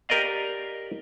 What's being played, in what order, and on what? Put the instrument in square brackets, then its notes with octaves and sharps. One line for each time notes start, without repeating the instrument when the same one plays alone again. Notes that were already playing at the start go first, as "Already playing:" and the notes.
[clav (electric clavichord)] G4 A#4 D5 D#5 F5